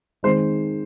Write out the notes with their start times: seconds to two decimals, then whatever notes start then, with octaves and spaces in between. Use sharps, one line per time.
0.23 D#3 G#3 C4 D#4 C5